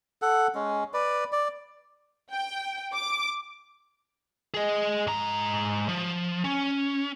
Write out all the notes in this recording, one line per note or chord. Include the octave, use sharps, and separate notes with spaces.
A4 F#5
G#3 C#4
B4 D5
D5
G5
D6
G#4 D#5
G#2 A#5
F3
C#4